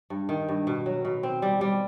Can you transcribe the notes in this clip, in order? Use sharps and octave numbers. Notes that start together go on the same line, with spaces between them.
G2
D#3
G2
B2
F#3
B2
C4
G3
G3